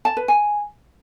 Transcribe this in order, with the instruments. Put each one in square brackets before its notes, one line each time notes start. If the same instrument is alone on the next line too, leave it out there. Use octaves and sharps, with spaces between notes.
[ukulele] A5
B4
G#5